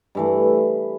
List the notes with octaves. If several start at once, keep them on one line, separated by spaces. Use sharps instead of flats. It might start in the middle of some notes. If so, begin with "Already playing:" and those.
G2 E3 A3